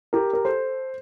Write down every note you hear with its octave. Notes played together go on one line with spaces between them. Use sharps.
G4 A#4
A#4
A4 C5